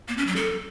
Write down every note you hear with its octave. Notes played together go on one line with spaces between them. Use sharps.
A#3
C#4
F#3
A4